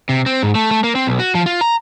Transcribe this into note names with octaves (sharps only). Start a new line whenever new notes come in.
C3
C4
G#2
A3
A3
A#3
C4
B1
F#4
F3
F4
A#5